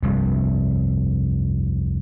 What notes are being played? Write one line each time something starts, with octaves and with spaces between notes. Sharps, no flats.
F1 C2 G2